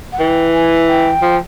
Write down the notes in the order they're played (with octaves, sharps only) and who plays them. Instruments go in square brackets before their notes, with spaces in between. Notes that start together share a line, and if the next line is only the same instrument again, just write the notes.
[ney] F#5
[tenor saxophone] E3 [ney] G5
[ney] G#5
G5
[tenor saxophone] F3